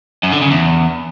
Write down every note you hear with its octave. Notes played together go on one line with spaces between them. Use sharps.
F#2
D3
C#3
E2